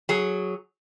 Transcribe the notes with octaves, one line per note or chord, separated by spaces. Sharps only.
F#3 G#4